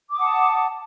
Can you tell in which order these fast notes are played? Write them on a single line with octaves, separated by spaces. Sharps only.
D6 D#6 F#5 A5